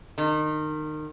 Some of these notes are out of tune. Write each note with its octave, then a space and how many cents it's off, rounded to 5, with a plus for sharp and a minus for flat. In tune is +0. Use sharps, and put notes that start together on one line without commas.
D#3 -25